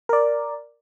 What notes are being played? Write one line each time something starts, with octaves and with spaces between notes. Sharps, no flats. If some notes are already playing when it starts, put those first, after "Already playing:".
A#4 D5